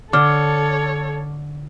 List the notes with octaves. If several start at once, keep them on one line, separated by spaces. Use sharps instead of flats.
D3 A4 C#5 D6 F6